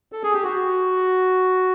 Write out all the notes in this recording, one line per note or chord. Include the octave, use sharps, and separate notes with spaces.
A4
G#4
G4
F#4